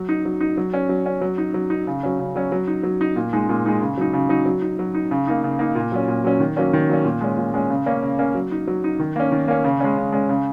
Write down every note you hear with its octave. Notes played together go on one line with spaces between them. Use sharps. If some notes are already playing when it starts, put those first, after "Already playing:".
Already playing: F#3
D#4
F#3
D#4
F#3
C#4
F#3
C#4
F#3
D#4
F#3
D#4
C#3
F#3 C#4
C#3
F#3 C#4
F#3
D#4
F#3
D#4
A#2
G#3 D#4
A#2
G#3 D#4
C#3
F#3 D#4
C#3
F#3 D#4
F#3
D#4
F#3
D#4
C#3
A#3 D#4
C#3
A#3 D#4
A#2
F#3 C#4
A#2
F#3 C#4
D#3
F#3 A#3 C#4
D#3
F#3 A#3 C#4
A#2
G#3 C#4
A#2
G#3 C#4
C#3
A#3 C#4
C#3
A#3 C#4
F#3
D#4
F#3
D#4
D#3
A#3 C#4
D#3
A#3 C#4
C#3
G#3 C#4
C#3
G#3 C#4
C#3